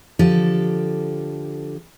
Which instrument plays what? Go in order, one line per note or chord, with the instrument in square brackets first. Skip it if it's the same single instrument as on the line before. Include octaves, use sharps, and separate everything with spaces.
[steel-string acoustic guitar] D3 F3 G4 A4